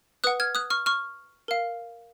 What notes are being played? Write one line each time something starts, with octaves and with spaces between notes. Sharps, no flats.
B4 F#5 D#6 F#6
F6 G#6
D#6 F#6
C#6 F6
C#6 F6
A#4 F5